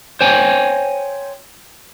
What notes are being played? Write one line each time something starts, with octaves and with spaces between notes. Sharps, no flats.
C5 C#5 G5 G#5